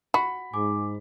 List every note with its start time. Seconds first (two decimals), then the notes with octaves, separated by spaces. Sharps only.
0.14 F#4 B5
0.53 G#2 G#5 D6